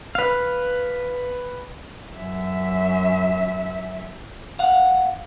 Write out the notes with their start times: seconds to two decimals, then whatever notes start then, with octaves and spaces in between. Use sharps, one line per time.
0.15 B4 F5
2.15 F#2 E5
4.59 F5 F#5